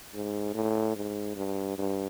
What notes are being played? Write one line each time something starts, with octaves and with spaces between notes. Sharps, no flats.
G#2
A2
G#2
G2
G2